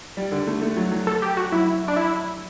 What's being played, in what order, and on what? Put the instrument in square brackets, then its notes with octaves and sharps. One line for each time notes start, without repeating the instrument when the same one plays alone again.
[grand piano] G3
D3
A3
A3
F#3
F#3
[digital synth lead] A4
G4
F#4
[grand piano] F#3 [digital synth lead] E4
[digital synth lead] D4
E4